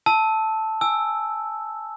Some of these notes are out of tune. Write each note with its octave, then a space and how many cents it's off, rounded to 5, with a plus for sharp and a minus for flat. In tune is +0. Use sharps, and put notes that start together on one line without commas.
A5 +0 E6 -20
G#5 +0 E6 +0